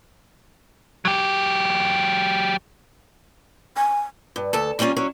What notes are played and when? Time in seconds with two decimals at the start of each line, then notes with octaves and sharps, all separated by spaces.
1.05 F#3 G4
3.77 G#5
4.36 G2
4.53 D2 A4 A5
4.79 G3 A#3 C4 C#4 F4
4.97 F#3 C#4 E4